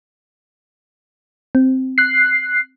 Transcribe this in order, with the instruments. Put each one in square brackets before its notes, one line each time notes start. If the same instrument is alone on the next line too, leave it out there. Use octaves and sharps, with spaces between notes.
[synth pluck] C4
[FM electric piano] F#6 C7